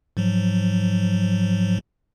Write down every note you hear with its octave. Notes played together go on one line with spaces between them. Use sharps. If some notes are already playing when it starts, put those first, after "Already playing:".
G#2 F3 F#3